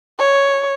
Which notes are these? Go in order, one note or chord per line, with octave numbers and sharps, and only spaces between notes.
C#5